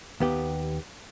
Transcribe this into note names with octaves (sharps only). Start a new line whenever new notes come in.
D#2 B3 G4